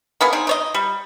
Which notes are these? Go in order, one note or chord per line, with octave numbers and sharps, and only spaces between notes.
A#3 B3 G#4
C4 D#4 G#4
D#4 C#5 D#5
G3